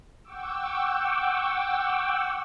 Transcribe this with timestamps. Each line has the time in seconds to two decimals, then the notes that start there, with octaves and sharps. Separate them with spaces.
0.23 F#5 G5 C#6 D6 E6